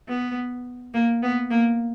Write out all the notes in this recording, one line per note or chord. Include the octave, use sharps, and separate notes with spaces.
B3
A#3
B3
A#3